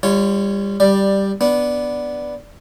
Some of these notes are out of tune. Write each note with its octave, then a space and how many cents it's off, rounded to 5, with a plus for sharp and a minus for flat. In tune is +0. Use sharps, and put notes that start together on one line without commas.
G3 +25 F4 -25 C#5 +0
G3 +0 D5 +10
B3 +0 D4 +0